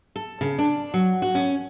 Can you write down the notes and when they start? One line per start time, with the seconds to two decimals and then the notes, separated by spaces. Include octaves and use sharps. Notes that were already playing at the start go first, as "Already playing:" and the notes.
0.16 A4
0.41 C#3
0.59 D4
0.94 F#3
1.22 F#4
1.35 C#4